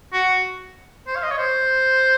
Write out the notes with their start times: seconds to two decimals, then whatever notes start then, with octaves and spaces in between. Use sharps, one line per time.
0.13 F#4
1.07 C5
1.16 F5
1.23 D#5
1.31 C#5
1.38 C5